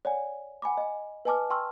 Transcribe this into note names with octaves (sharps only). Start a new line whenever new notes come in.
C#5 D5 F#5 G#5
F#5 G#5 B5 D6
D#5 G#5
B4 D#5 G#5 A5 D6 F6
G5 A5 C6 C#6 E6 F6